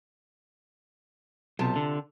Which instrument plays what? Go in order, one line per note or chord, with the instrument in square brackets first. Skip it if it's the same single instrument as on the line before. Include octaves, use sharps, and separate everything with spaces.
[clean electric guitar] B1 [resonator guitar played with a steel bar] C3 F4 A5
[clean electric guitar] D3